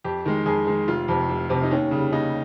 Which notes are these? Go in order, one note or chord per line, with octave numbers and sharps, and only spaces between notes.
F2 G4
D#3 G#3
F2 G#4
D#3 G#3
F1 F4
F2 C3
F1
F2 C3
D#4
D#2 C#4
C#3 G3
D#2 D#4